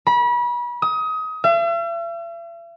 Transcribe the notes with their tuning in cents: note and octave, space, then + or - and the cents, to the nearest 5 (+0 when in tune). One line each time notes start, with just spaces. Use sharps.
B5 -35
D#6 +25
E5 +45